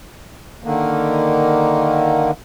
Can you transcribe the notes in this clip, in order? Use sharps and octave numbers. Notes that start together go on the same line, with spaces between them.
D3 D#3 A#3